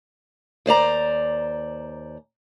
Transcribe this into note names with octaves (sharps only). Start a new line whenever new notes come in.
D#2 C5 D5 A#5